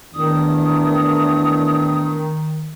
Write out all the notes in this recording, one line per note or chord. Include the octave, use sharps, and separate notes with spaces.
E2 A2 D#3 D4 D#6